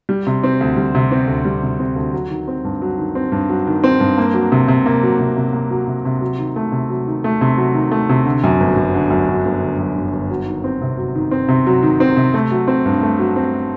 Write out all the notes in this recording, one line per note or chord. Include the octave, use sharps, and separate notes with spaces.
G3
C3
C4
D2
G3
C3
C4
D2
G3
C3
C4
D2
F#3
D#3
C4
G2
F#3
D#3
C4
G2
F#3
D#3
C4
G2
A#3
F#3
C3
C3
A#3
F#3
C3
C3
A#3
F#3
C3
C3
F#3
D#3
A3
C3
F#3
D#3
A3
C3
F#3
D#3
A3
C3
D3
F#2
G1
G1
D3
F#2
G1
G1
D3
F#2
G1
G1
F#3
D#3
C4
C3
F#3
D#3
C4
C3
F#3
D#3
C4
C3
A3
F#3
C4
G2
A3
F#3
C4